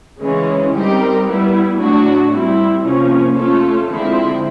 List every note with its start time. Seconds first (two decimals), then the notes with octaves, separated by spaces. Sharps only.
0.20 C#3 E3 G#3 C#4
0.73 G3 C4 D#4 G4 A#4
1.25 G3 B3 E4
1.77 A2 F#3 A3 D4 F#4
2.31 G3 C4 E4
2.83 C3 F3 A#3 C#4
3.36 A3 C#4 F4 A4
3.89 D3 F3 G#3 C4 E4